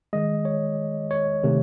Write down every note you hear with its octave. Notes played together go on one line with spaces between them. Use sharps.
D#3 G#3 D#5
C#5
C#5
C3 D#3 A3